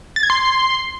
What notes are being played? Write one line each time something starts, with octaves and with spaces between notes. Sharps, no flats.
A6
G#6
C6